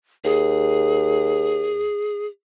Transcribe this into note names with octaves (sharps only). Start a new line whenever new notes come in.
D#2 G#4